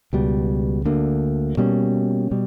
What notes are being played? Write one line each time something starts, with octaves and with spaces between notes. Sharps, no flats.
C#2 B2 G3
D2 D3 A#3
B2 G3 A#3 C#4
B2 G3